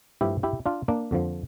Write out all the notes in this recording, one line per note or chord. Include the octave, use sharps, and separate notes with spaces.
G2 F3 A3 E4 G4
E4 G4
D4 F4
A#3 D4
F2 D3 F3